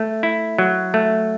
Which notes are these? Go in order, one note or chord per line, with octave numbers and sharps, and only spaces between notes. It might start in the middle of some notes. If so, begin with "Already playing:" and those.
Already playing: A3
E4
F#3
A3